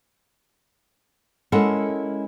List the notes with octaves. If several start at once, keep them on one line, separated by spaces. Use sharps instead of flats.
G#3 C#4 E4 A4 A#4 F#5